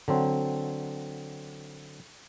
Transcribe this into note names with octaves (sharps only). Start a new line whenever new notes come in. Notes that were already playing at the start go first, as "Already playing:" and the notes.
D3 F#3 C4